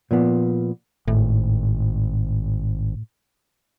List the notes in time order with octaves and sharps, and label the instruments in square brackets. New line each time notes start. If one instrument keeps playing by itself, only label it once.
[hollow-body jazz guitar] A#2 F3 B3
[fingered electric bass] G#1 [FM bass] A2